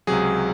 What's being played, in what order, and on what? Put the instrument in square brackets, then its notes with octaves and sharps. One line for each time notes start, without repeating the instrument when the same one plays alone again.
[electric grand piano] C#2 C3 F#3 G#4